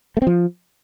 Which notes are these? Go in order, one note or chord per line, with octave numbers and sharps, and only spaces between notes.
A3
C4
F3